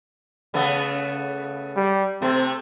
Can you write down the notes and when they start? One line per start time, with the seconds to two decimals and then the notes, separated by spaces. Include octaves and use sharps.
0.54 C#3 A3 B3
1.77 G3
2.22 C3 A3 C4